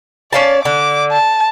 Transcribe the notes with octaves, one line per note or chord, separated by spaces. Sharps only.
C#4 D5 F5 A5
D3 D6
A5